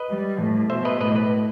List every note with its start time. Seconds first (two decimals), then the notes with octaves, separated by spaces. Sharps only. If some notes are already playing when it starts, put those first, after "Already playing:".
Already playing: B4 D#5
0.09 G3
0.40 A2
0.70 B2 C5 E5
0.85 B4 D#5
1.00 A2 B4 D#5
1.15 B4 D#5